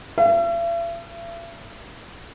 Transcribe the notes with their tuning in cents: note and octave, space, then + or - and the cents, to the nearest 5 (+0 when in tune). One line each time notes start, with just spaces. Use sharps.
E5 +45